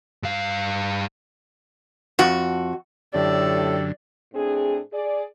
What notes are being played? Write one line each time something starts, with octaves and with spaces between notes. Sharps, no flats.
G2 F5
F2 F#4
F#2 A2 D3 G4 A4 D5
A2 C4 D4 G#4
G#4 D5